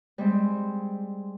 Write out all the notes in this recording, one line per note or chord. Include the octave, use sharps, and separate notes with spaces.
G3 G#3 C4